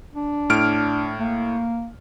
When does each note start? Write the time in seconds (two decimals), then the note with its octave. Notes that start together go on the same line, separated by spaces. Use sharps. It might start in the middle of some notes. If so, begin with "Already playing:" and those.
0.14 D4
0.50 A2 F6 D7
1.19 A#3